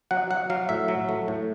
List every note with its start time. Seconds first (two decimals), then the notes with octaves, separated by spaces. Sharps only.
0.11 F#3 F#5
0.31 F#3 F#5
0.50 F#3 F5
0.69 A2 E5
0.88 F#3
1.09 A3
1.28 A2